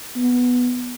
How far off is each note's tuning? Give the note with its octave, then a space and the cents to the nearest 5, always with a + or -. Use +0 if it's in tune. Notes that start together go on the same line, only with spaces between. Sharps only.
B3 +0